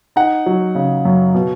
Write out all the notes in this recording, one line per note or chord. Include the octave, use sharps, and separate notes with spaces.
D#4 F#5
F#3
C#3
F#2
B2